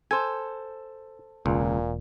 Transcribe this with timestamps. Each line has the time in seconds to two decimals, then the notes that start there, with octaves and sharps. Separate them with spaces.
0.11 A4 C5 G#5
1.46 E1 C#2 A#2